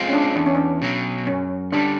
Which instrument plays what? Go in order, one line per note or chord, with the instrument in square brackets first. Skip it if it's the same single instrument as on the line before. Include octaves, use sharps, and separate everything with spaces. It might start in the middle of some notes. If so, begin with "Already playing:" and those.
Already playing: [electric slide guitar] G#3 C4 F4
[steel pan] C#4
D4
[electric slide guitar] E2 [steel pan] D4
[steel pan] C#4
D4
[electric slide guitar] B2 F#3
[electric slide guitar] F#2 [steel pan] C#4
[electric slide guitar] D3 G3 [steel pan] D4